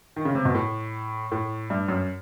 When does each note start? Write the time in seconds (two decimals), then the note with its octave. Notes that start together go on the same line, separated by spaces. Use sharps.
0.16 D#3
0.25 C#3
0.35 C3
0.45 B2
0.55 A2
1.32 A2
1.70 G2
1.88 F#2